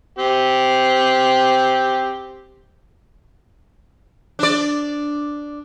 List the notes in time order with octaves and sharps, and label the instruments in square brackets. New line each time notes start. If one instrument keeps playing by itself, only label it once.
[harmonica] C4 G4
[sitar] D4 D5